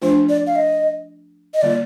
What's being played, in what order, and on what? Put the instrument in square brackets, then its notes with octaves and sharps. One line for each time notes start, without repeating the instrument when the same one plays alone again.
[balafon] F3 A3 D4 F4 [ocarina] C5
[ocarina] D5
F5
D#5
D#5
[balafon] D3 G3 A#3 F4 [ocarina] D5